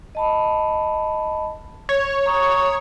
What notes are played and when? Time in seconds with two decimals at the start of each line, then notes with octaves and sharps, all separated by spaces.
0.15 D#5 A5 B5
1.89 C#5
2.26 A#5 C#6 D#6